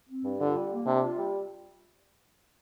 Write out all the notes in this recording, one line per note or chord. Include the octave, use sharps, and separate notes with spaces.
C4
G2
D3 F4
G3
A#3
C3 D4
F4
G3